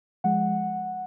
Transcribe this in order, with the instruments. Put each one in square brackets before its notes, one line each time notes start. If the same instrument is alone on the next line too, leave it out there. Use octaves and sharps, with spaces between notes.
[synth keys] F3 G#3 F#5